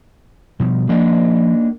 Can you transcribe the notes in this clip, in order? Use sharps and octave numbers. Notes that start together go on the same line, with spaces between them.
B2 F3 G3
F3 A#3 D4 D#4